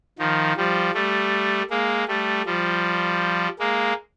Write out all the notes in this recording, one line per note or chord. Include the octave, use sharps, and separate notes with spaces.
D#3 F3
F3 G3
G3 A3
G#3 A#3
G3 A3
F3 G3
G#3 A#3